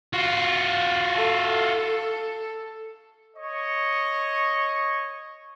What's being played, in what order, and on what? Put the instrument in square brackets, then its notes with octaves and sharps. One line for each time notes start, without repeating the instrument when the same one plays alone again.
[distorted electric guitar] F4 F#4
[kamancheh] A4
[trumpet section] C#5 D#5 C#6